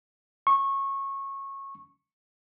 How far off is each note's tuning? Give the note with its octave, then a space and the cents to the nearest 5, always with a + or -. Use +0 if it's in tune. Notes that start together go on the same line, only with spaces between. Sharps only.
C#6 -20